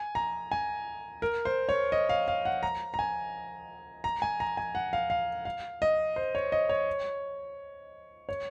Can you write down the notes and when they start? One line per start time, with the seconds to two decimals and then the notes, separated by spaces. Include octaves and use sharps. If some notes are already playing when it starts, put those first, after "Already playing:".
Already playing: G#5
0.15 A#5
0.52 G#5
1.22 A#4
1.45 C5
1.69 C#5
1.92 D#5
2.09 F5
2.28 F5
2.45 F#5
2.63 A#5
2.94 A#5
2.99 G#5
4.04 A#5
4.22 G#5
4.40 A#5
4.57 G#5
4.75 F#5
4.93 F5
5.10 F5
5.45 F5
5.82 D#5
6.16 C5
6.35 C#5
6.52 D#5
6.69 C#5
8.29 C#5